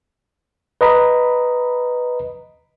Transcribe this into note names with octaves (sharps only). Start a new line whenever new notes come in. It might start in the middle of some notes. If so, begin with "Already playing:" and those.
B4 D#5 A#5 B5